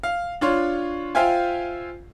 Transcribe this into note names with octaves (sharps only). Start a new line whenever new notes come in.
F5
D4 F4 C#5 C6
F4 C5 E5 F5 G5 G#5